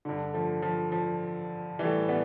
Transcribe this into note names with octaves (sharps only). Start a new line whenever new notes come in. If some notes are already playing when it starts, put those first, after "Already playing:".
G2 D3
F3 A3
F3
F3
A2 E3 G3
G3 B3